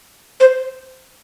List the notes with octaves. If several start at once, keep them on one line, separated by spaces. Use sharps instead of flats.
C5